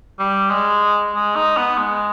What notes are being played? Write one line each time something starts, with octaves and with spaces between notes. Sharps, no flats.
G3
G#3
G#3
D#4
B3
G#3